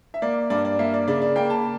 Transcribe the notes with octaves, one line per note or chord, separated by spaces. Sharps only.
E5
A#3 D5
G2 D5
D5
A#3 E5
D5
C#3 D5
D5
A#3 G5
A5